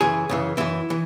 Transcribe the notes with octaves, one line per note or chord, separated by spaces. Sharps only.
F#2 C#3 E3 G#4
F#2 C#3 E3
F#2 E3 E4
E3